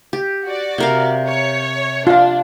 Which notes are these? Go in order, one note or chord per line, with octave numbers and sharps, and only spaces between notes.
G4
F#4 D5
C3 A#4 F5
C#5
D4 F4 F5